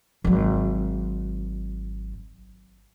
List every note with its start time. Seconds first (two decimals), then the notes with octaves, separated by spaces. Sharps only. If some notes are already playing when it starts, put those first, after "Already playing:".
0.24 G#1 F#3